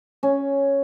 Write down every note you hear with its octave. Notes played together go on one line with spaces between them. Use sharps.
C#4